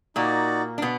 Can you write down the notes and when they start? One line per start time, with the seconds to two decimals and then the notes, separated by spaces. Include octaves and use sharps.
0.16 A#2 A#3 D#4 F#4 D5
0.78 D4
0.82 B2 B3